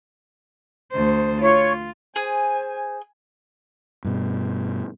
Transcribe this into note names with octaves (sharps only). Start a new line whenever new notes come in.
D2 C5
F4 C#5
G#4 C5 G#5
G2 B2